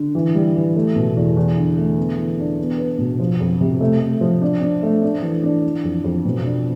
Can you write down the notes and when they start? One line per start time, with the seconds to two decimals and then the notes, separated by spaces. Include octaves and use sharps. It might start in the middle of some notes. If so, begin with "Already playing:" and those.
Already playing: D3
0.15 E3
0.35 G3
0.56 E3
0.75 A3
0.96 B2
1.17 E2
1.37 E2
1.57 D3
1.78 A3
1.97 B3
2.18 E3
2.39 D4
2.59 B3
2.78 B4
2.99 B2
3.20 F3
3.40 F2
3.61 C3
3.80 A3
4.00 A3
4.21 F3
4.42 D4
4.61 D4
4.83 A3
5.02 D4
5.22 E3
5.43 D4
5.64 E3
5.84 F2
6.04 F2
6.25 B2
6.44 D4